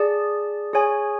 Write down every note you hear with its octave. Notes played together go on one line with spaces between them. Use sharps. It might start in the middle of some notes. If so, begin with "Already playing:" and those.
Already playing: G#4 D5 A5
G#4 C#5 G#5